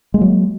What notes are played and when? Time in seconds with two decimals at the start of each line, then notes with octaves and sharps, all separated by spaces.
0.14 G#3
0.18 A#3
0.21 F#3